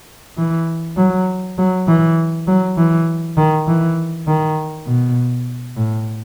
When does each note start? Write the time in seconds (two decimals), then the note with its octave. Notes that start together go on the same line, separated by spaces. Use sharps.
0.37 E3
0.97 F#3
1.58 F#3
1.87 E3
2.47 F#3
2.77 E3
3.37 D#3
3.67 E3
4.27 D#3
4.86 B2
5.76 A2